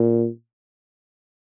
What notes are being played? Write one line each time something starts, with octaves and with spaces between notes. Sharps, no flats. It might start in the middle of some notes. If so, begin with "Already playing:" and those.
Already playing: A#2